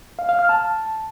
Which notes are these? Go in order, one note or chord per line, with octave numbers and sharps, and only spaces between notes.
F5
F5
F6
A5